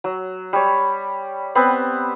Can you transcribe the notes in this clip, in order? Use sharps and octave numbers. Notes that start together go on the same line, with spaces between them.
F#3
G3 C#5
B3 C4 B4